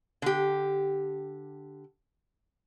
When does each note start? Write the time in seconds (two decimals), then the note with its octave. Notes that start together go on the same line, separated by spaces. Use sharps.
0.22 D3 G4